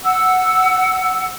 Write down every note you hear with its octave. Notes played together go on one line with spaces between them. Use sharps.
F#5 E6